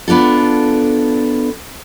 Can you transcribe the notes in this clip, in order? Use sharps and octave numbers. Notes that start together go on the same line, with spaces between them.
B3 D4 F4 A4